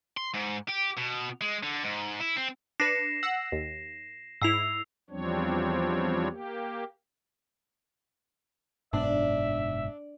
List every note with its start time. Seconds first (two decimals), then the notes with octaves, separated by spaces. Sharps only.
0.17 C6
0.34 G#2
0.68 G4
0.97 B2
1.41 G#3
1.63 D3
1.84 G#2
2.20 E4
2.37 C4
2.80 D4 B4 A#6 C7 C#7 E7
3.23 F#5 E6
3.52 D#2
4.42 G#2 E4 E6 C7 F7
5.10 E2 F3 G3 C4 D4 C#5
6.30 A#3 G4
8.93 F#1 G#2 B2 D4 E5